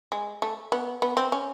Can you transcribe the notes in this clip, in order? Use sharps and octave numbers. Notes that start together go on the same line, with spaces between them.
G#3
A3
B3
B3
C4
C#4